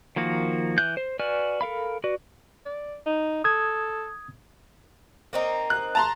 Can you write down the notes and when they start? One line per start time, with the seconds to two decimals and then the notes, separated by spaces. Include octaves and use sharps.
0.16 D#3 F3 A#3 F#4
0.78 E3 F#6 G6
0.97 C5
1.19 F#4 B4 D5 G#5 F6
1.61 A4 A#4 F5 B5
2.04 F#4 B4 D5
2.66 D5
3.06 D#4
3.44 A4 D#6 G#6
5.33 A#3 C4 D#4
5.70 F#6
5.95 A5 A#5 C6